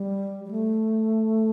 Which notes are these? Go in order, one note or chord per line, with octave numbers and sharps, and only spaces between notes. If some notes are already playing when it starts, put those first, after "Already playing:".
Already playing: G3
G3
A3